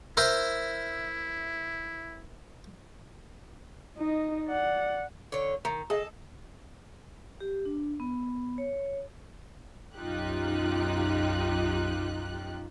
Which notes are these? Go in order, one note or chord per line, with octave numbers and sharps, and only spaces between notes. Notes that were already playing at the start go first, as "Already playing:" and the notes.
E4 A#4 C5 E5
D#4 D#5
D5 F#5
D3 C#5
D#3 A#5
G#4 A4 D#5
G4
D4
B3
C#5
B1 F#2 D#4 F4 G4 F#6